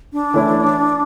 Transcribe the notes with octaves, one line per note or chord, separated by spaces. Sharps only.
D4
E3 A3 C#4 E4